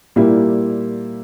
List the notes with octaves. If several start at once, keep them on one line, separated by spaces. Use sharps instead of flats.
A#2 G3 A#3 E4